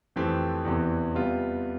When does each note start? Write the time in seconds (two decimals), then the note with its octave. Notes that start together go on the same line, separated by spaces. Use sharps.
0.16 F2 E3 A3 C4 G4
0.65 E2 C3 E3
1.14 C3 G3 B3 F4